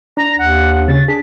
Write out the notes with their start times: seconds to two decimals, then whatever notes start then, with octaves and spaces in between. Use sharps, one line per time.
0.17 D4 A#5
0.39 D#2 F#5
0.88 C#3 C#4 A6
1.08 D4 G#4 B6